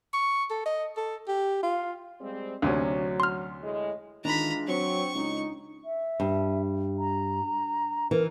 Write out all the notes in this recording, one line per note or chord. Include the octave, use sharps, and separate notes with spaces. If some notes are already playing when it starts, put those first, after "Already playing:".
C#6
A4
D#5
A4
G4
F4
G3 G#3 C4
D2 C3 F#3 C#4
C6 F6
A2 G#3
D#3 E3 G#3 D4 F4 A#5 B5
F#3 C4 C#6
C#2 D#4
E5
G2
A#5
E3 A#4